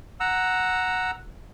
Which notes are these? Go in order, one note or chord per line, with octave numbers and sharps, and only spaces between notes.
F#5 A#5 E6